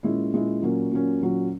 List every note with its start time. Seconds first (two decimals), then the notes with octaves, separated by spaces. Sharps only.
0.03 A#2 G#3 C#4 E4
0.33 A#2 G#3 C#4 E4
0.62 A#2 F#3 A#3 C#4
0.91 A#2 F#3 A#3 C#4
1.21 A#2 F#3 C#4